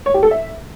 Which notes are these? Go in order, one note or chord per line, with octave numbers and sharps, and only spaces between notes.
C#5
G4
A4
E5